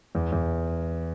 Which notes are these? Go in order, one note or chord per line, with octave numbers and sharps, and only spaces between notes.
E2
E2